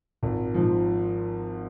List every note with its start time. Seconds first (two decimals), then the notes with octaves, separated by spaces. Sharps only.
0.23 G#1 A#2
0.54 G#2 F3